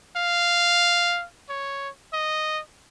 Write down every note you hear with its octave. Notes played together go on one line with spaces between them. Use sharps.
F5
C#5
D#5